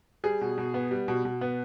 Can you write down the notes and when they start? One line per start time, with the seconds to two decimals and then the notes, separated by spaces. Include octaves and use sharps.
0.24 G3 G#4
0.41 B2
0.58 B2
0.74 B3
0.91 G3
1.08 B2
1.25 B2
1.41 B3